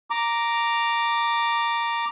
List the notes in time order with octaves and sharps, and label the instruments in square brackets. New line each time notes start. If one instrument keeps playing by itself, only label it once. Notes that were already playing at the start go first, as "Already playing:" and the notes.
[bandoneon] A#5 D6